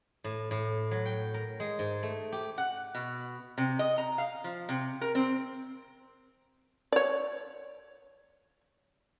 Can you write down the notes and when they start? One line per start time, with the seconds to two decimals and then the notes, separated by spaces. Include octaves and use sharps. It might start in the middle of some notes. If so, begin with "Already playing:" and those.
0.24 A2
0.51 A2
0.91 F#3
1.06 G5
1.34 A#4
1.60 G#3
1.79 G#2
2.03 A3
2.32 G4
2.58 F#5
2.95 B2
3.58 C3
3.79 D#5
3.98 A#5
4.18 F5
4.44 F3
4.69 C3
5.01 A#4
5.15 C4
6.92 C#5 D5